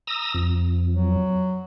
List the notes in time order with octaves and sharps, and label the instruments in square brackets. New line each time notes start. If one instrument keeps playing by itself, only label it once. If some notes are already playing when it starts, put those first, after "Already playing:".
[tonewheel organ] A#5 D#6 E6
F2
[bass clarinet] F#3